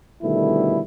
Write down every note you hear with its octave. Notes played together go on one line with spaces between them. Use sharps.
B2 D3 D#3 G3 A3 E4